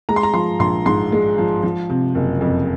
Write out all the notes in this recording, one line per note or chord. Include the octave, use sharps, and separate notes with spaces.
G#3 A#5
C6
A#5
F3 C6
A#1 C6
G#2 C6
G#3
F3
F3
C3
F#1
F2